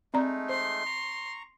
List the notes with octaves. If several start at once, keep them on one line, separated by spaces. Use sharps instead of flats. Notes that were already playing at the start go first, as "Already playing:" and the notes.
G#3 A3 C4 D#4 D5 A#5
C5 C6
A#5 C#6